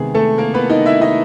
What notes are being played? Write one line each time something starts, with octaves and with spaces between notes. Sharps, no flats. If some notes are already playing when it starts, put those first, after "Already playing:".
Already playing: C3 D#3 G#3 B3 G#4
A3 A4
A#3 A#4
B3 B4
D#4 D#5
E4 E5
D#4 D#5